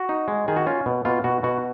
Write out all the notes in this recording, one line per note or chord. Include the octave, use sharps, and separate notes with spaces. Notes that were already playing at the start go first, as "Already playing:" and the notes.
Already playing: F#4
D#4
G#3
D#3 G#4
F#4
C#4 F4
B2
B2 F4
B2 F#4
B2 F#4